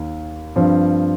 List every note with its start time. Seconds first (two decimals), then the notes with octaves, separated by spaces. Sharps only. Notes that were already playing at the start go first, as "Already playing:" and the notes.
Already playing: D#2 D#3
0.56 G2 F3 C4